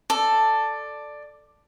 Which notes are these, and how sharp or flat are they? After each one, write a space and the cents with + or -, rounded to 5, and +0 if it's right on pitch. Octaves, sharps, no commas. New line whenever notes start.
A4 +0 D5 +10